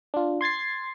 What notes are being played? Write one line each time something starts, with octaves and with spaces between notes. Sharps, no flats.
D4 F4
C6 G#6 A6 C7